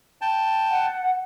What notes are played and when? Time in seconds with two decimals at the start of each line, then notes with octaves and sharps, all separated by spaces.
0.21 G5 A5
0.70 F#5